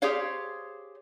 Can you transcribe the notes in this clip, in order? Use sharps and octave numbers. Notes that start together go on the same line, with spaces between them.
G4 G#4 C5 C#5 F5